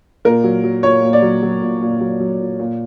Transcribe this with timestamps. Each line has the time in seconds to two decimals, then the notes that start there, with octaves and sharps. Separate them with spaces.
0.25 A#2 A#4
0.44 F#3
0.64 F#3
0.83 A#2 C#5
1.02 A#2
1.13 D5
1.22 F#3
1.43 F#3
1.62 A#2
1.81 A#2
2.01 F#3
2.20 F#3
2.40 A#2
2.59 A#2